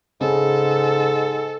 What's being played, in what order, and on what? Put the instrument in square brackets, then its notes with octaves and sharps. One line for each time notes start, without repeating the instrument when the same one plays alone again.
[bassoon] G#2 [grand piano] C#3 [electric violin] A4